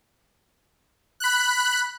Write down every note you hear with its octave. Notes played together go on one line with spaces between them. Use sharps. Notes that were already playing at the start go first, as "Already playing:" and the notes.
B5 F#6